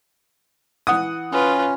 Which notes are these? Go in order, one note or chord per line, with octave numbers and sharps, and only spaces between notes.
E3 F#5 D#6
C#4 F4 B4